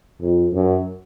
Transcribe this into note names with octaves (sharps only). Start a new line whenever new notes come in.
F2
F#2